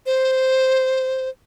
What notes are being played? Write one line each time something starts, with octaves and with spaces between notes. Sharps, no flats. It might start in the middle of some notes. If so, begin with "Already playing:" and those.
C5